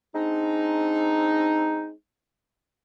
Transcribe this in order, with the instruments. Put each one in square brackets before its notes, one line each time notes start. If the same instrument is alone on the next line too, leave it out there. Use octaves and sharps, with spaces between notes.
[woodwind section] G#3 C4 D4 D#4